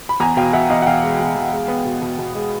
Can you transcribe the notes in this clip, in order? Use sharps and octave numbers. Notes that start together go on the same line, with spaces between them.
B5
E2 G#5 A#5
B2 F5 G5
B2 E5 F#5
E2 D#5 F5
F#5
B2 F5 G5
G#3
E2
E2
G#3
B3
B2
B2
B2
G#3